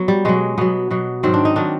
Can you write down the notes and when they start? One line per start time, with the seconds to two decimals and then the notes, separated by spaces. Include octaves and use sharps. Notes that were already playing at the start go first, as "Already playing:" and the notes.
Already playing: F#3 B3
0.08 G3
0.25 B2 F#3 G#3
0.58 B2 F#3 B3
0.91 B2 F#3
1.23 G#2 D#3 F#3 C4
1.34 D4
1.45 D#4
1.56 D#3 F#3 D4